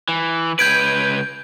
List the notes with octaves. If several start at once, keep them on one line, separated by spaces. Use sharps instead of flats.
E3
C#2 B4 G6 G#6 D7